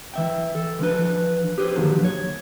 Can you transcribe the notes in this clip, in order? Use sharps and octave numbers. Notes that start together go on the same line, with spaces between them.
E3 E5 G5
A4
E3 F3 D4 B4
G4 G#4 B4 C5
F#2 A#2 D3 D#3 F3 F#3
C#5